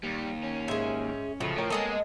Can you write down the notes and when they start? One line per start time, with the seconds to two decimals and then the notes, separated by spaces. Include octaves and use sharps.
0.03 D#2 G3
0.43 C#4
0.68 G#2 G#3 G#4 E5
1.40 C#2 C#3 F3 F#3 A3
1.57 A2 A#4 C#5 G5
1.70 G#3 A#3 B3 G#4 A4 D#5 A5